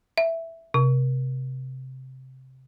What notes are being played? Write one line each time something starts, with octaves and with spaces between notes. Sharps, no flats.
E5
C3